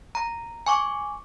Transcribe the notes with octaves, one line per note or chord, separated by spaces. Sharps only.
A#5
G#5 C#6 D6